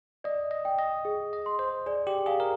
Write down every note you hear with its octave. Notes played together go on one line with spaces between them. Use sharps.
D5 D#5
D#5
G5
D#5
G#4
D#5
C6
C5
G#4 D5
G4
G#4 F5
A#4